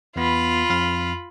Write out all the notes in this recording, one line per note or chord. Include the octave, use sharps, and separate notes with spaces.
E2 B3 F4 B5
F2 F5